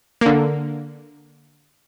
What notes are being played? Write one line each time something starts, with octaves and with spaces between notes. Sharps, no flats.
D3 A#3